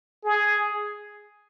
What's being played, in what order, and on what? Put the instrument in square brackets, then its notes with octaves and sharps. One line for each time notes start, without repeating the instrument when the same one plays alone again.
[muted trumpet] G#4